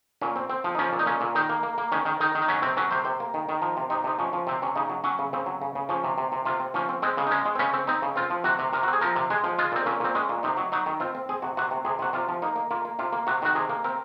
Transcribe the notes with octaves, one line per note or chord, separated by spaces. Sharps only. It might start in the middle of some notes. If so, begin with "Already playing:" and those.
A#2 C#4
C4
C4
F3
D#4
F3 C#4
A#2
D#4
A#2 C#4
A#2
D#3 D#4
A#3
A#3
A#3
D#3 C#4
D#3
D#3 D#4
D#3
D#4
F#3 C#4
C3 C4
F#3 C#4
C3 C5
C3 C5
A#3
D#3
D#3
F3 A#4
C3
C3 D#4
C3 D#4
F3 C#4
F3
C3 C4
C3 C#4
C#3 D#4
F#3
F#3 C#4
C#3
C#3 C4
F#3
C#3
C#3
F3 C#4
C3
C3
C3
C3 F4
C4
F3 C#4
C4
G#3 C4
C#3
D#4
G#3 C#4
G#3
C4
C#3 C#4
C4
C4 D#4
C#3
C4 F4
F3
C3 F#4
C3
C3 A#4
F#4
C4
G#4
F3 A#4
C3
G#3 G#4
F3
G#3 F4
A#2 C4
A#2 C#4
A#2 C4
G#3 C#4
A#2
C3 D#4
F#3
F#3 D#4
D#3
C4 F4
C4
C4 G#4
C3 F#4
C3 F#4
C3
C3 G#4
C3 F#4
C3 F4
F3
A#3 D#4
A#3
A#3 F4
A#3
C3 F4
A#3
C3 F#4
D#3 F#4
C3 G#4
A#3
C4 A#4